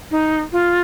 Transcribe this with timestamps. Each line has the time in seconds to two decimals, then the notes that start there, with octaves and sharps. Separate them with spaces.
0.11 D#4
0.52 F4